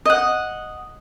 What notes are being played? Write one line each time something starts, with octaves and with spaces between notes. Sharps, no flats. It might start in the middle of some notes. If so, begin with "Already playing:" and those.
D#5 F#5